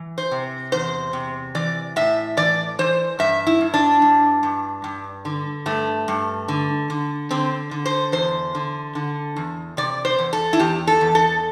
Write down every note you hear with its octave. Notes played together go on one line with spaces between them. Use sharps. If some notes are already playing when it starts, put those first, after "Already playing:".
Already playing: E3
C5
C3
E2 C5
C3
E3 D5
A2 E5
E3 D5
E3 C5
G2 E5
E4
G2
D4
G2
G2
G2
D3
G2 A3
G2
D3
D3
D3 C4
D3
C5
E2 C5
D3
D3
E2
C3 D5
C5
E2
A4
E4
E2 G4
A4
E2
A4